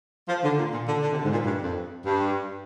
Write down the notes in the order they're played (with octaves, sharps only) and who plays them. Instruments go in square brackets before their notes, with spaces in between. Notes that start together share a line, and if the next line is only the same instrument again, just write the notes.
[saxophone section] F3
D3
A#2
A#2
D3
D3
C3
D3
G#2
A#2
G2
F2
G2